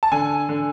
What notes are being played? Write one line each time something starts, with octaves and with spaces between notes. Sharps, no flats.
A5
D3 G#5
D3